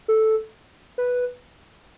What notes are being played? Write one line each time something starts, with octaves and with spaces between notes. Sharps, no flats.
A4
B4